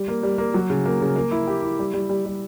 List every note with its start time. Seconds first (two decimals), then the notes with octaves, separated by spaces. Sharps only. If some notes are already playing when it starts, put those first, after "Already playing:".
Already playing: G3
0.08 A#3
0.23 G3
0.38 A#3
0.54 F#3
0.70 C#3
0.86 A#3
1.02 C#3
1.16 A#3
1.31 E4
1.47 G4
1.62 E4
1.79 G3
1.94 G3
2.09 G3
2.26 G3